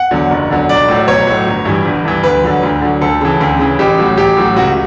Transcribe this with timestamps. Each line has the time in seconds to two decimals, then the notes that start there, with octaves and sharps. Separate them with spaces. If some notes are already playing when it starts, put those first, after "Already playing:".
Already playing: F#5
0.11 E2 D3 F#3
0.30 F#1
0.50 E2 D3 F#3
0.69 B1 D5
0.88 A2 F#3
1.08 B1 C#5
1.27 A2 F#3
1.46 G1
1.65 G2 E3
1.85 G1
2.05 G2 E3
2.23 D2 B4
2.43 D3 F#3
2.63 D2
2.82 D3 F#3
3.01 D2 A4
3.21 C#3 E3
3.41 D2
3.59 C#3 E3
3.79 A1 G4
3.99 A2 F#3
4.18 A1 G4
4.37 A2 F#3
4.56 C#2 F#4